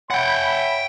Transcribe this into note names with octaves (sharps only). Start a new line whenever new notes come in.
C#5 E5 F#5 G5 B5